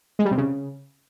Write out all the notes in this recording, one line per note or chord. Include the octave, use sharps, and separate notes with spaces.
G#3
G3
C3
C#3